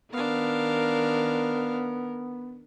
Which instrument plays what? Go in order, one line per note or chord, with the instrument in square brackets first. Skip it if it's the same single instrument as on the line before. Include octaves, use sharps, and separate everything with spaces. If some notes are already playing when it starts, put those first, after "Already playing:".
[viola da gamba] D#3 A#4 [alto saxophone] B3 [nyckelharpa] D4 F5